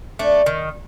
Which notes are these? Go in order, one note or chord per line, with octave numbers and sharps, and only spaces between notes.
A3 D4
D#3